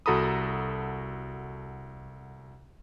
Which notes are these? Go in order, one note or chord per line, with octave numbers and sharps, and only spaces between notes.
C2 F#4 A4 A#5 B5 D#6